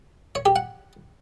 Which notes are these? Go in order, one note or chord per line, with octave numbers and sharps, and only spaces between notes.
C#5
G4
F#5